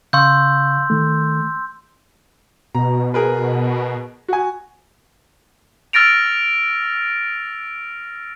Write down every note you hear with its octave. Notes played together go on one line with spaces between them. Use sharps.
C#3 F5 C6 C#6 E6 G6
D#3 A3
B2 A#5
G#4 A#4 B4
F#4 G#5
E6 F6 A6 A#6 D7 F7